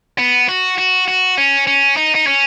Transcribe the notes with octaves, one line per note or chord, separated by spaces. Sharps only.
B3
F#4
F#4
F#4
C#4
C#4
D#4
D#4
C#4